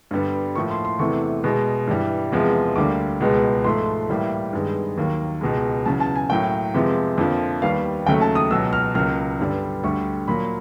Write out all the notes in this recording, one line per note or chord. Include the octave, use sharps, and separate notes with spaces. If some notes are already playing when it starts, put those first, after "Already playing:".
G2 D3 G3 B3
A2 F3 A#3 C#6
C6
C6
E2 C3 E3 A3 C#6
B2 G#3 B3
G2 E3 G3
E2 C3 F3 G#3 B3
D2 D3 G3 A#3 D6
C#2 B2 G#3 B3
G#2 F3 A3 C6
A2 E3 G3 A#3
G2 D#3 G#3 B3
D#2 D#3 F#3 A#3
C#2 B2 G#3
E2 C#3 F#3 A5
A5
G#5
A2 F#3 A#3 G5
F2 C3 F3 G#3 B3
F2 D3 F3 A#3
D#2 D#3 G3 B3 F5
D#2 C#3 F#3 A3 G5
A5
D#6
C#2 B2 F#3 E6
F6
C#2 C#3 F#3 A#3 F6
G2 D3 G3 B3
D2 D3 G3 C#6
A#2 F#3 A#3 B5